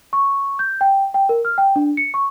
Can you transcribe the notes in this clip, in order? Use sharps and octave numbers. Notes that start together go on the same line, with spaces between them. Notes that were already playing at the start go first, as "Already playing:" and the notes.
C#6
G6
G5
G5
A#4
F6
G5
D4
C#7
C#6